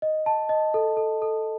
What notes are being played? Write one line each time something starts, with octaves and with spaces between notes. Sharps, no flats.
D#5
A5
D#5
A4
A4
A4